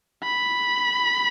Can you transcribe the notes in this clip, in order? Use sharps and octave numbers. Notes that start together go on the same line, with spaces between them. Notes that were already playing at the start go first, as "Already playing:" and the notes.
B5